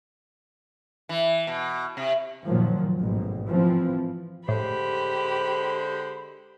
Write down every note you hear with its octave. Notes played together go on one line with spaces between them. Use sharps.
E3
B2
C3
F#1 A#2 D#3 F3 F#3
A1 G#2 B2
E3 F3 C4
A2 D3 G#3 G4 C5 B5